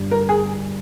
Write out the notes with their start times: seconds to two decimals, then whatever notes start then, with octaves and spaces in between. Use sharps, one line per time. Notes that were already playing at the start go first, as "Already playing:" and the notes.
Already playing: G1 G2 G3
0.11 A#4
0.29 G#4